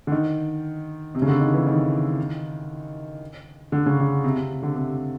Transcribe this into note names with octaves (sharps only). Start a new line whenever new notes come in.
D3
D#3
C3
C#3
D3
D#3
E3
D#3
D3
C#3
D3
C3
C3
D3
C3